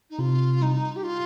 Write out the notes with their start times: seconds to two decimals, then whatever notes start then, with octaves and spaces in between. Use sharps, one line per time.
0.09 D#4
0.19 C3 F4
0.61 G3 D#4
0.96 G4
1.03 F4